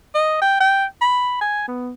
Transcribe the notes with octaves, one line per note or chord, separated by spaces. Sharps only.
D#5
G5
G5
B5
G#5
B3